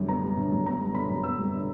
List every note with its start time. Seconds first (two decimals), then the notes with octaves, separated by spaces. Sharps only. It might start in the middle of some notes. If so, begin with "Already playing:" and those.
Already playing: F#2 D3 G3
0.08 B3 A#5
0.22 G3
0.37 D3
0.52 F#2
0.66 B3 A#5
0.81 G3
0.95 D3 B5
1.09 F#2
1.23 B3 E6
1.39 G3
1.53 D3